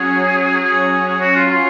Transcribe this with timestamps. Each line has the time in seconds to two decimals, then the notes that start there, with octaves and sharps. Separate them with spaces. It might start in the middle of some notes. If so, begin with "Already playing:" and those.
Already playing: F#3 C#4 F#4 G#4 C#5
0.63 G#4
1.07 G#4
1.21 F#4
1.35 F4
1.50 F4